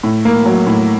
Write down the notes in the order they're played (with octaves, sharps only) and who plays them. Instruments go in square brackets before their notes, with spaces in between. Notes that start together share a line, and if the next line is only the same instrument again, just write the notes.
[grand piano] A2
A#3
F#3
A2